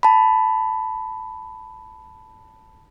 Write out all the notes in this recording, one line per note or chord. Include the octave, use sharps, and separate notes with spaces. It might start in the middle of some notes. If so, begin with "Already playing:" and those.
A5 B5